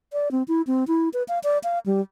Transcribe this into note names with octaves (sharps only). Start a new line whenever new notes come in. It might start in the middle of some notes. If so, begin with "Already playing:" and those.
D5
C4
E4
C4
E4
B4
F5
D5
F5
G3